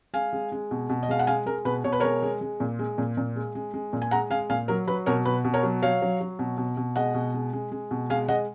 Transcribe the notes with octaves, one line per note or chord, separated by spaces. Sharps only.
G#3 F5 G#5
G#3
G#3
B2
B2
D#5
G#3 F5
F#5
G#3 F5 G#5
G#3 A#4
B2 B4
B2 C#5
B4
G#3 A#4 C#5
G#3
G#3
A#2
G#3
A#2
A#2
G#3
G#3
G#3
A#2
G#5
G#3 F#5 A#5
G#3 F5 G#5
A#2 F5 G#5
F#3 A#4
F#3 B4
B2 A#4 C#5
B2 B4
B2
A#4 C#5
F#3
F#3 C#5 F5
F#3
F#3
B2
B2
B2
G#3 D#5 F#5
B2
G#3
G#3
G#3
B2
G#3 F5 G#5
G#3 D#5 F#5